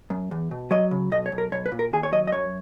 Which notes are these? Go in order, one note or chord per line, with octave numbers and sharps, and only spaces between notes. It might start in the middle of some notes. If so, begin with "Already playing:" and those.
F#2
E2
B2
F#3 D#5
C#3
B1 D#5
C#5
B1
A#4
B1 C#5
B4
A#2
A#4
D#2 G#4
C#5
F#3 D#5
D#5
F#2 C#5